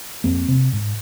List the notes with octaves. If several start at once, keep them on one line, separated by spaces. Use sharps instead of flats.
F2 A#3 C4
C3
G#2